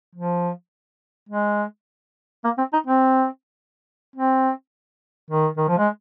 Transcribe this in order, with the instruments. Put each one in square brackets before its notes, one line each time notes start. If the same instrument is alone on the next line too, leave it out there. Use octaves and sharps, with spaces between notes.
[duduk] F3
G#3
A#3
C4
D#4
C4
C4
D#3
D#3
F3
G#3